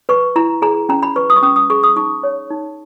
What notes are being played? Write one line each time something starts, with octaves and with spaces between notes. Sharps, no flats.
B4 C#6
E4 A#5
G#4 A#5
C#4 A#5
B5
B4 C#6
D#6
C#6
C#4 D#6
D#6
G#4 C#6
D#6
D#4 C#6
C#5
D#4